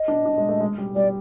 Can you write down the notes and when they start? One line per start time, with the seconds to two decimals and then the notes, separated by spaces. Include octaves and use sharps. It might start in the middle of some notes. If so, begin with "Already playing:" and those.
Already playing: D#5
0.08 D4
0.26 D4
0.38 G#3
0.49 A3
0.60 G#3
0.78 G3
0.96 G3 D5